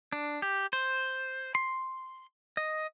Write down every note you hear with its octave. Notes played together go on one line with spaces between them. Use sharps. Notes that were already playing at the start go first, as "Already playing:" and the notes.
D4
G4
C5
C6
D#5